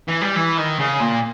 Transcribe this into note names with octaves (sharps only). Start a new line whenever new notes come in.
E3
G3
E3
D#3
C#3
A#2